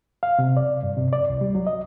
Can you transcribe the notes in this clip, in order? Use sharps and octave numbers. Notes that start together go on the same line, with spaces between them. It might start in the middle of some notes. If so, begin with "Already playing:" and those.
F5
C3
D5
G2
C3
D5
C2
G3
F#3
D#5